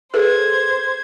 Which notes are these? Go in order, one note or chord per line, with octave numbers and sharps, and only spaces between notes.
G#4 A4 B4 C5 G#6